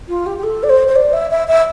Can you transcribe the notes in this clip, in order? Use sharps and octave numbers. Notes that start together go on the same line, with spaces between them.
F4
G4
G4
A4
D5
C5
C5
D5
E5
E5
E5